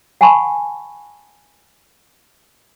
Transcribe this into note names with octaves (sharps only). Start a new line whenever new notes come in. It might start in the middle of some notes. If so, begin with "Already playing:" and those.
F#5 G#5 A5 B5 C#6